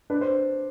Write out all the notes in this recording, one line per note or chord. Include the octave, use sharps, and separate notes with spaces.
D4 B4
C5